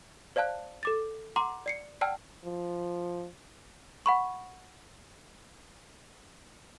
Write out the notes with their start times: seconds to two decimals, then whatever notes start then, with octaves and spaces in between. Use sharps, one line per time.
0.36 C5 D5 F5 A5 F#6
0.83 A4 D6 A6
1.36 F#5 A#5 C6 D6
1.66 D5 C7 C#7
2.01 D5 F#5 G5 A5 E6 F6
2.44 F3
4.06 F#5 B5 C#6